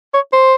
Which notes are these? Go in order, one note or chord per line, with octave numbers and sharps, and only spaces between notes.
C#5
C5